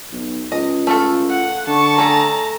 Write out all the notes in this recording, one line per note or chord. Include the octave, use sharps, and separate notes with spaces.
B1
C#2 D#5
A3 F4 A4
F#5
D3 A5 C#6
A3 G#4 A4 A#5